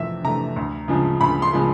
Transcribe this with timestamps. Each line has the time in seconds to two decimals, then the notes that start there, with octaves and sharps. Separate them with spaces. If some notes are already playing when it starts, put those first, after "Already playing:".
Already playing: F2 C3 E3 A3 E5
0.24 C3 E3 A3 A#5
0.56 D2
0.88 C#3 F3 G#3
1.21 D2 B5
1.42 C6
1.53 C#3 F3 G#3